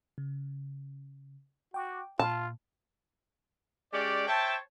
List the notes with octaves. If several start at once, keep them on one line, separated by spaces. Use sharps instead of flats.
C#3
F#4 G5 D6
A#2 F4 A5
G#3 C#4 G4 D5
C5 C#5 E5 G5 A5